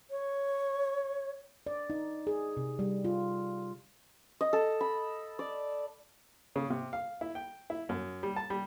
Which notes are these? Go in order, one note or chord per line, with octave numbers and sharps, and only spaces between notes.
C#5
D5
D#4
G#4
C3
G3
F4
D#5
A4
B5
D5
C#3
C3
F5
E4
G5
E4
F#2
G3
A5
G3